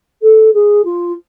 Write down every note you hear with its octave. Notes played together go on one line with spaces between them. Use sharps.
A4
G#4
F4